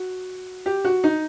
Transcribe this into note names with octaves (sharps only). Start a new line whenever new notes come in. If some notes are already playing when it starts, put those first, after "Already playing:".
Already playing: F#4
G4
F#4
D#4